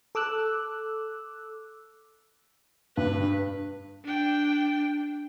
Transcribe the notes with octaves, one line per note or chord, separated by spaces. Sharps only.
A4 D6 E6 F#6
G2 B4
D4 G5